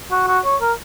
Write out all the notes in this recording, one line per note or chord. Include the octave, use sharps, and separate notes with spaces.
F#4
F#4
C#5
A#4